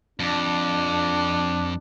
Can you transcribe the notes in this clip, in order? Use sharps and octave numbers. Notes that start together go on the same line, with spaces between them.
F2 D4